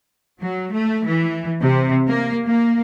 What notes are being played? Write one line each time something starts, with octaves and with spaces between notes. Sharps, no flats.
F#3
A3
E3
C3
A#3
A#3